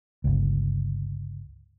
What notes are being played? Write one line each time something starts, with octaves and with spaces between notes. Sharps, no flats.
G1 C#2